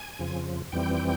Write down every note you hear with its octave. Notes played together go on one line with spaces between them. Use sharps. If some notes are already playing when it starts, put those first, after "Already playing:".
Already playing: G#5
F2 C#3 F3
F2 E3 G3 C4 G5